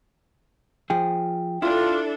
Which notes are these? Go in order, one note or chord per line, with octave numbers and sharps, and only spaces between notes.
F3 G#4 G5
D4 E4 F4 A4